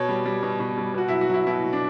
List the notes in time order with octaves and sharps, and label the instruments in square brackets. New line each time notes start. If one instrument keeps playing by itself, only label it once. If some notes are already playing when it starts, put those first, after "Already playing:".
Already playing: [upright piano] B2 C#5
G3
G3
B2
B2
G3
B2 F#4
F#3 E4
F#4
F#3 E4
B2 E4
B2
D4